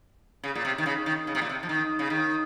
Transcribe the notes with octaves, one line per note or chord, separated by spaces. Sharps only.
C#3
A#2
C3
D#3
C#3
D#3
C#3
C3
A#2
C3
F3
D#3
C#3
D#3